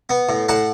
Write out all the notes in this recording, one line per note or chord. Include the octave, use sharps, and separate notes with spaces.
B3
A2
A2 F#5 A5